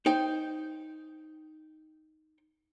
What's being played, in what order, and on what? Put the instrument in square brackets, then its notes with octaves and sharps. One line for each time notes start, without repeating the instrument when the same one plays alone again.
[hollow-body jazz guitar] D#4 C5 G5